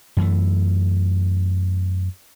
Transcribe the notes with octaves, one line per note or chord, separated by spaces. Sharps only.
F#2 E3 A3